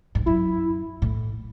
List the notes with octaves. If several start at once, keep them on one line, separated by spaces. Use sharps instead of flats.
G#2
F#2 E4
A2